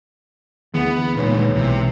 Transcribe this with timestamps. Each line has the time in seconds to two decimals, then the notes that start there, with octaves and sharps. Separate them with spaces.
0.74 D2 E3 B3 G#4 F#5
1.16 A#2 G#3 D#4 B4 C#5
1.56 B1 C3 E3